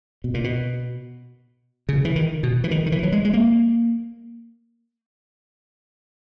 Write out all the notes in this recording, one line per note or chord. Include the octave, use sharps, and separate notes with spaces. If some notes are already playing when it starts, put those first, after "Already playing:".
B2
A#2
B2
C#3
E3
D#3
B2
E3
D#3
D#3
E3
F#3
G#3
G#3
A#3